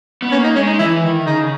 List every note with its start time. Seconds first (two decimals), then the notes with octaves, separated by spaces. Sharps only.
0.22 B3
0.32 A#3 C#4
0.44 D#4
0.55 G#3 C#4
0.67 D#4
0.78 E3 E4
1.03 D#3 E4
1.26 C#3 D#4